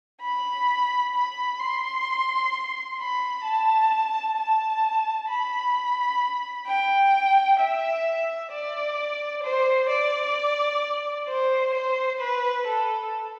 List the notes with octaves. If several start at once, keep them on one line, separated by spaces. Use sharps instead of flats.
B5
B5
C6
B5
A5
A5
B5
G5
E5
D5
C5
D5
C5
C5
B4
A4